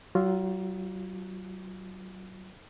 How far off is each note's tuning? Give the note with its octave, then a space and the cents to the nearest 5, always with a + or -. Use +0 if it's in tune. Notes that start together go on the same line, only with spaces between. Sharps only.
F#3 +35 F4 +0